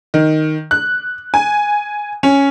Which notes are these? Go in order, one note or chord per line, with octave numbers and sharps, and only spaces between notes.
D#3
F#6
G#5
C#4